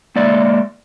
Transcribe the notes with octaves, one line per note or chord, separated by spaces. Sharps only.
G#3 A#3 D5 E5